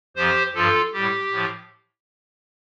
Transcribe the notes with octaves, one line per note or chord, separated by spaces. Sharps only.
F2 F3 G4 C5
G2 F3 F4 A4
A2 G3 G4
A2 F3